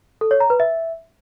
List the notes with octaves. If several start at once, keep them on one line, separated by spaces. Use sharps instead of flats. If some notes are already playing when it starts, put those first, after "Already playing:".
A4
C#5
A#5
B4
E5